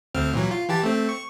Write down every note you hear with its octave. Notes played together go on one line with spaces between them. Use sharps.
D2 C4 F6
A#2 E3 F#3
F4
E3 G4 A5
A3 C4
C#6